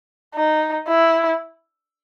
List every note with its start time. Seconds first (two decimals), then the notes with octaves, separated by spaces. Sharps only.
0.35 D#4
0.88 E4